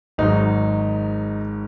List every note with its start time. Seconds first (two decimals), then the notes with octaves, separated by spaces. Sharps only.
0.18 G#1 G#2 F#3 D#4